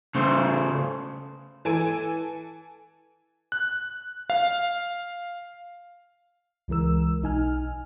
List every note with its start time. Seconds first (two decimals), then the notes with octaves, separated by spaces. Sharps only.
0.15 C#3 A3 C5
1.65 E3 A4 G#5 D7
3.52 F#6
4.30 F5
6.68 C#2 E3 G#3 A#4 E6
7.22 B1 D#4 G#5 F6